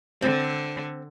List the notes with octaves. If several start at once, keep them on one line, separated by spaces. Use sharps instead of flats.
D3 C4